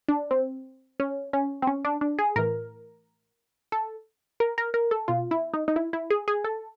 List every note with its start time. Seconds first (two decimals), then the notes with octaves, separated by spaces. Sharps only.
0.08 D4
0.31 C4
1.00 C#4
1.33 C#4
1.62 C4
1.67 C#4
1.85 D4
2.01 D4
2.19 G#4
2.36 A2 E3 A#4
3.72 A4
4.40 A#4
4.58 A#4
4.74 A#4
4.91 A4
5.08 B2 F4
5.31 E4
5.54 D#4
5.68 D#4
5.76 E4
5.93 E4
6.10 G#4
6.28 G#4
6.44 A4